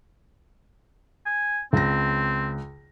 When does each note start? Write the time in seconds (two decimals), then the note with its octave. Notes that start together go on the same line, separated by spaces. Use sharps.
1.26 G#5
1.73 C#2 C4 A#6